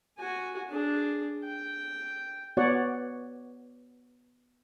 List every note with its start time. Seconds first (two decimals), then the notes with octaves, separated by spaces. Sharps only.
0.18 F#4 G#5
0.69 D4 G#4
1.44 G5
2.57 B3 F#4 C#5 D5 F#5